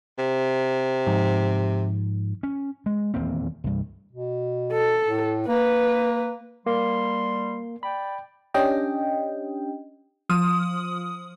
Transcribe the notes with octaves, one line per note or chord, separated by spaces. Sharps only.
C3
G#2 F3
C#4
G#3
D#1 E2 A#3 C4
C2 G2
B2
A4
A2
A#3 B4
G3 A#3 C6
D5 G5 B5
C#4 D4 G4 D#5 G5
F3 D#6